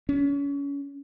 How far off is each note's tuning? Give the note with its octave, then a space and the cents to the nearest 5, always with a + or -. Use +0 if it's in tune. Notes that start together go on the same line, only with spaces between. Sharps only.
C#4 +30